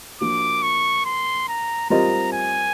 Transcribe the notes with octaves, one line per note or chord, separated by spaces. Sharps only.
F3 A#3 D4 F#4 D6
C#6
C6
A#5
G3 C4 F4 A#4 D#5 A#5
G#5